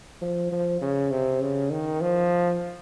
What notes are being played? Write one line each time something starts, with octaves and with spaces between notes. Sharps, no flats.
F3
F3
C#3
C3
C#3
D#3
F3